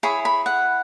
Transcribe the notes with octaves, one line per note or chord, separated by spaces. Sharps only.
E4 G#4 C#5 B5
B5
F#5